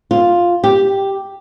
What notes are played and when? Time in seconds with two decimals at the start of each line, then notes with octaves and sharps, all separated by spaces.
0.11 F4
0.64 G4